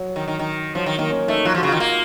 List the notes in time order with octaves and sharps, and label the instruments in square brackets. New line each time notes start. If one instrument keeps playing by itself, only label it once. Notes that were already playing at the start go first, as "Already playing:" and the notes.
Already playing: [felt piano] F#3
[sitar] D#3
D#3
D#3
[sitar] F3 [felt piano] F#3
[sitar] D#3
[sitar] D#3 [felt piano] A#3
[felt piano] C#4
[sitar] A3 [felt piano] D#4
[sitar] F#3 [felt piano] F4
[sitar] F3 [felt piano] F#4
[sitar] C#3
[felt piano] F4
[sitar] D#3
[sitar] A#3 [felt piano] F4